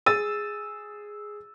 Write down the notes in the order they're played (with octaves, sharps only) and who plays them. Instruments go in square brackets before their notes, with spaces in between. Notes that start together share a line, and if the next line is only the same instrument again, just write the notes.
[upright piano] G#4 A6 D#7 [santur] E6